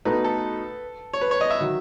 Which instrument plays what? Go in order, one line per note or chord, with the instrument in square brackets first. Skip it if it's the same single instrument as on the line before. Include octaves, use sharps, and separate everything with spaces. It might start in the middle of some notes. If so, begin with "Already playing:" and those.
[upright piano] B2 A3 D#4 [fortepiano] B4
[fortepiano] A4
C#5
B4
C#5
D#5
E5
[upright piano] D#3 F#3